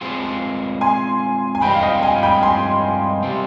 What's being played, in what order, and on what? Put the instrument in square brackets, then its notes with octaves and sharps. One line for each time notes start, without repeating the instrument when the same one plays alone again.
[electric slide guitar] G#3 C4 F4 G#4
[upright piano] G#5 C6
G#5
[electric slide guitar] G2 F3 G#3 C4 [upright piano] G5 B5
[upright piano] F5
D#5 G5
F5 G#5
G5 B5
G#5 C6
[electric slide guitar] C3 G3 C4